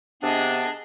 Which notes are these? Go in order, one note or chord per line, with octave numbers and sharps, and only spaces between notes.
C3 B3 D4 G#4 D#5